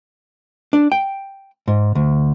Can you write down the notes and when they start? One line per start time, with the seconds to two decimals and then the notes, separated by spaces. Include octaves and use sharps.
0.73 D4
0.92 G5
1.68 G#2
1.95 D2